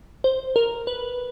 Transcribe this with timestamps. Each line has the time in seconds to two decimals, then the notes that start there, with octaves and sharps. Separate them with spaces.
0.24 C5
0.56 A#4
0.87 B4